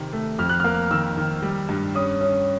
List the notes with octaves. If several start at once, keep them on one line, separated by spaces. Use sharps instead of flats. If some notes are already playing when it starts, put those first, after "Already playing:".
Already playing: C3 D#3
A3
F2 F6
F#6
A#3 F6
D#3 E6
D#3
G3
G2
C#4 D#6
C#4